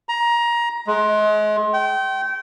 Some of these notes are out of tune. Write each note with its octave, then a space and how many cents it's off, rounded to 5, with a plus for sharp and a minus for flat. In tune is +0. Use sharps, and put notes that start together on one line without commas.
A#5 +20
G#3 +35
G5 -30